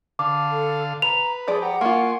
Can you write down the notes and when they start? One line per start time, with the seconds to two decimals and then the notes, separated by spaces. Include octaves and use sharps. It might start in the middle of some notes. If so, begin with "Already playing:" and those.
0.19 D3 F5 A5 D6
0.50 A4
1.02 B4 A#5 F7
1.48 F3 G#4 D5
1.62 G4 F#5 A#5
1.81 A#3 F4 G#5 C6 C#6